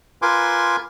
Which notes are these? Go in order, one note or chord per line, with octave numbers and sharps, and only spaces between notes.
F4 A#4 B4 G#5 C6 D6